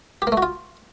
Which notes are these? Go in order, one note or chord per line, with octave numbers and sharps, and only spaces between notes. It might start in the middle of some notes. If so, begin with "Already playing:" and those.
G4
A#3
A3
F#4
F4